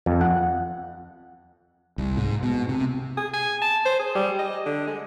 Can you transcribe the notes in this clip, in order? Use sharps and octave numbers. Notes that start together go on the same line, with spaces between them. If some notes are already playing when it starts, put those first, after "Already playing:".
F2
F#5
C2
G#2
B2
C3
G#4
G#5
A5
C5
G#4
G3
D#5
D3
G#3